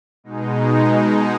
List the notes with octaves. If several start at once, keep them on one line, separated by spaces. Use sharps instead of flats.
B2 G#3 D#4